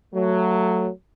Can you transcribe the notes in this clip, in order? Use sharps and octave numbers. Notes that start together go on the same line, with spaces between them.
F#3 A3